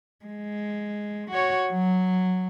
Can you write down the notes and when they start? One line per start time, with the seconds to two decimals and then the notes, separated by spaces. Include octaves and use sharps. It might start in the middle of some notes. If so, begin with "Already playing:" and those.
0.25 G#3
1.30 F#4 C#5
1.69 F#3